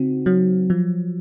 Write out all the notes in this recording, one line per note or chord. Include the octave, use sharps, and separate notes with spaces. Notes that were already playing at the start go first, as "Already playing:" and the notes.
Already playing: C#3 C4 D#4 F#4
F#3
F3